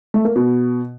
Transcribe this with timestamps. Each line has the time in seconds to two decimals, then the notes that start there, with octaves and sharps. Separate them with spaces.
0.14 A3
0.25 A#3
0.36 B2